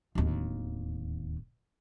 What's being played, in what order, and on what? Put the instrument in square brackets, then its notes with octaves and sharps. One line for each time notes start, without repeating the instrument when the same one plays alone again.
[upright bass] D1 D#2